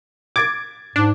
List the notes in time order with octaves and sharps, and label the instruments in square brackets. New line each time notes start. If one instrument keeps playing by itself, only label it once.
[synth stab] D6 [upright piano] G#6 A6
[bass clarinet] G#2 [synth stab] D4